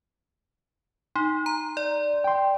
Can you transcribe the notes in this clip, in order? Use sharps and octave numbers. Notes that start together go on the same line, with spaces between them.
D#4 C6
A#5
D5
G5 C6